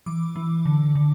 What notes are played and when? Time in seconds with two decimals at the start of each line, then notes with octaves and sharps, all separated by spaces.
0.06 E3 D6
0.36 E3
0.65 D3
0.95 D3